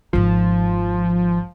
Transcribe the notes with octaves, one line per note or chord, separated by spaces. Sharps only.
G#1 F3 D#4